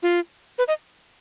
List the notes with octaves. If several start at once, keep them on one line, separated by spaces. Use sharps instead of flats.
F4
B4
D#5